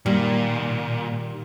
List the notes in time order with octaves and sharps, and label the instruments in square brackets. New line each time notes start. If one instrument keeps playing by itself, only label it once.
[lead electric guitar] A#2 [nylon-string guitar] D#3 G3